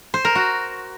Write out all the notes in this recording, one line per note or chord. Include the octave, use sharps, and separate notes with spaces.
C5
A#4
F#4